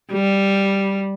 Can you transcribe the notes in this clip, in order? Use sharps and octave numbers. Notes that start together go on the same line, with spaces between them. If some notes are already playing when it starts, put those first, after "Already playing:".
G3